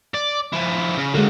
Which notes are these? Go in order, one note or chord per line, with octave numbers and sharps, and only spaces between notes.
D5
F3 E4
C#3
D3 F#3 G#3 A#3